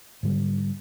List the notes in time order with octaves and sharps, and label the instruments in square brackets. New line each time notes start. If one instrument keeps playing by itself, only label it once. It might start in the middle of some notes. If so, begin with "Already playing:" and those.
[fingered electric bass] G#2 D3 G3